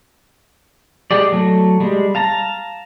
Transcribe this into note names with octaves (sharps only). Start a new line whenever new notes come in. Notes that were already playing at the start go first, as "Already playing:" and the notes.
G#3 G4 G#4 D5
F#3 A3
G3 G#3
F5 A5 A#5